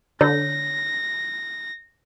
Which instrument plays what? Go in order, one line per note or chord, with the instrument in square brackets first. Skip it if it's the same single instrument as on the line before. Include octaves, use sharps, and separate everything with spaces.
[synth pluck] D3 [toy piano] C#5 [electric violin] A#6